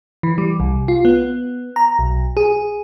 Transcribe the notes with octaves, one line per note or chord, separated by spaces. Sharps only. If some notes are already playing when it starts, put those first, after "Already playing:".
E3
G3
C2
F4
B3
A#5
B1
G#4